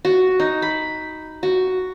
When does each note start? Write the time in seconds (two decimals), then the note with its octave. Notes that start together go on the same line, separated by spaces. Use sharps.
0.05 F#4
0.40 D#4
0.62 B5
1.43 F#4